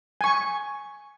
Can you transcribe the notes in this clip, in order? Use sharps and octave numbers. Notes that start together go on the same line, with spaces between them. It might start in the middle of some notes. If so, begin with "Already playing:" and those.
G#5 C#6